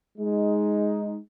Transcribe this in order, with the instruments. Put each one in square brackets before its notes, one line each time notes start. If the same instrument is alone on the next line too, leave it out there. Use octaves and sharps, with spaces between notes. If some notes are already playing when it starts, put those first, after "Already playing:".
[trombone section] G#3 D#4